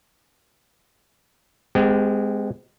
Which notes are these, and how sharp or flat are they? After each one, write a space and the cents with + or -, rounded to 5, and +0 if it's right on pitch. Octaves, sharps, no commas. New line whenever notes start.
G#3 +0 C4 -35 G4 +20